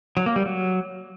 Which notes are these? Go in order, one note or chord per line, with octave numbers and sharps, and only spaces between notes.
F#3
A#3
G3
F#3